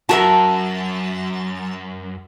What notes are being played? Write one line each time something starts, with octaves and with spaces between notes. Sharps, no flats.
F#2 F#4 A#4 E5 A5